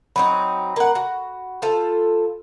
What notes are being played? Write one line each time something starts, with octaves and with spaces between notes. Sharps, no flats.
F#3 C4 D#4 B5
A#3 F#5
F#4
F4 A4 C5